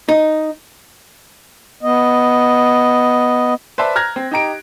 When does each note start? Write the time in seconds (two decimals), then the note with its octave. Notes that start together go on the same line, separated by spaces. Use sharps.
0.09 D#4
1.83 B3 D#5
3.78 B4 C5 D5 E5 A5
3.96 A#5 F6 F#6 G#6 A#6
4.16 C4
4.31 D#4 G4 A#5 D7